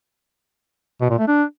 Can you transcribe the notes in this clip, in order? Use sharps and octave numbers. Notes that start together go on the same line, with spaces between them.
B2
A#2
A3
D4